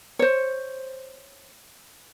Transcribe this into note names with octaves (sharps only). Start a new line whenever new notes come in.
C5 C#5